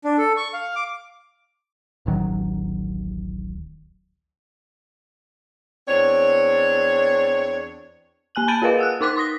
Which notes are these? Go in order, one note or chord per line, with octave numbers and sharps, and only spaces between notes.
D4
A4
C#6
F5
D6
D1 A1 D#3 F#3
E2 C4 D4 C#5
A#3 G#5 F#6 F#7
A5 B5 G6 A6 D7 D#7
F4 G#4 A#4 B4 D#5 F5
F#5 E6 F#6
D#4 A#4 C6 D6 F#6 B6
C6 D#6 A#6 B6